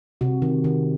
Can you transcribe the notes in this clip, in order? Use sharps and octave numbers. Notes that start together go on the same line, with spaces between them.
C3 F#4
D#3
D#3